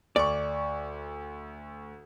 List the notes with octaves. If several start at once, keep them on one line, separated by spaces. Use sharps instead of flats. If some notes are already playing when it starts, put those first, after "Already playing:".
D2 D5 C#6